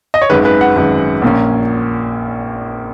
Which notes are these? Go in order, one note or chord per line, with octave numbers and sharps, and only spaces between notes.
D#5
C#5
G#1 F#2 D#3 G#3 B4
B4
F#5
G#1 F#2 D#3 G#3
A#1 A#2 A#3 C#4